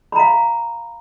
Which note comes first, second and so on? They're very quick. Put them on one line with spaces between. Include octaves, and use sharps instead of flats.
B5 A#5 F5